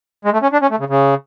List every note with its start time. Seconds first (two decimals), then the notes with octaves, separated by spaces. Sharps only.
0.25 G#3
0.33 A3
0.43 C#4
0.53 D4
0.62 C#4
0.71 A3
0.79 C#3
0.90 C#3